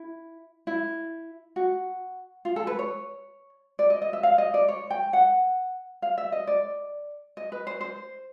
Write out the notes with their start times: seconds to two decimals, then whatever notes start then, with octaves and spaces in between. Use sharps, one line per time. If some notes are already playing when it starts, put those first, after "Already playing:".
Already playing: E4
0.67 E4
1.56 F#4
2.45 F4
2.56 A4
2.67 B4
2.79 C#5
3.79 D5
3.90 D#5
4.02 D#5
4.13 E5
4.23 F5
4.38 D#5
4.54 D5
4.68 C#5
4.90 G5
5.13 F#5
6.02 F5
6.18 E5
6.32 D#5
6.47 D5
7.37 D#5
7.52 B4
7.67 C5
7.81 C5